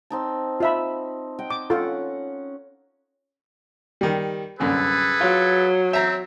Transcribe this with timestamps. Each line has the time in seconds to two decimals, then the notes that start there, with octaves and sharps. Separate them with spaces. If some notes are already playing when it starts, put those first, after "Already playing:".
0.10 C4 D#4 A5
0.60 F4 E5 B5
1.39 D#5 F#5 G5
1.50 D6
1.70 C#4 F4 A4 F#5 C#6
4.01 D#3 G3
4.60 C2 F#2 D3 G#4 A4 B4
5.21 F#3 F4
5.93 C4 E5 A#5